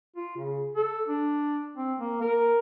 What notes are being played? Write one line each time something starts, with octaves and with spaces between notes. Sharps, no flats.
F4
C#3
A4
D4
C4
A#3
A#4